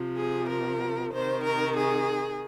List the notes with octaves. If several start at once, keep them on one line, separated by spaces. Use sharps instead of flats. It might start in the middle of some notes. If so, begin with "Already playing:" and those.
Already playing: C3 F3
G#4
A#4
C3 D#3 C5
A#4
G#4